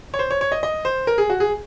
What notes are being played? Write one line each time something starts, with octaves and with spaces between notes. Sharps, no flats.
C#5
C5
C#5
C#5
D#5
D#5
C5
A#4
G#4
F#4
G#4